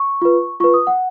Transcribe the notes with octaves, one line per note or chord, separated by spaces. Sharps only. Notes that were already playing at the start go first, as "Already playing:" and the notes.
Already playing: C#6
F4 B4
F4 B4 C#6
D#6
F#5